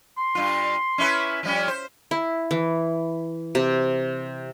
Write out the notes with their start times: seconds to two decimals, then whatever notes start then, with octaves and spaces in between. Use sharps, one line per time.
0.17 C6
0.35 G2 F4
0.98 C#4 E4 B4
1.43 F3 G3 C#4
1.68 C5
2.11 E4
2.51 E3
3.55 C3